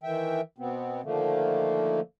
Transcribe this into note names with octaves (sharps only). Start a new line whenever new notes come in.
D#3 E3 E5 G5
B2 B3 C4
D3 D#3 F3 A3 A#3